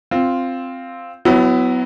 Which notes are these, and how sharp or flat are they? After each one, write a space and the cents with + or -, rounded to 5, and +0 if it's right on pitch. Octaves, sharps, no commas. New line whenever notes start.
C4 +0 F4 +0
F#3 +0 B3 +30 E4 +0